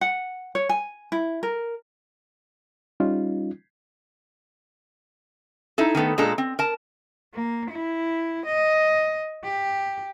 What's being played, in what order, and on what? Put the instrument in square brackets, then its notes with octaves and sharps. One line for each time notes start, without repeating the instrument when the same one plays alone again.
[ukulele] F#5
C#5
G#5
E4
A#4
[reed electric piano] G3 C#4 D#4 F4
[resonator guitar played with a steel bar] D#4 E4 A4
D#3 A3 B3 A4
A#2 G#3 D4 A4 A#5
C4
A#4 A5
[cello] A#3
E4
D#5
G4